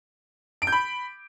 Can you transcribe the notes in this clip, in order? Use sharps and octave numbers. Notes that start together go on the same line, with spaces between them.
D7
G6
B5